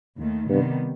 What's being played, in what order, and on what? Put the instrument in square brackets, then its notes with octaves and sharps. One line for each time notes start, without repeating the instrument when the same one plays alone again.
[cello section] D#2 D#3 A3
[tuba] G2 [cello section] C3 D#3 G3 B3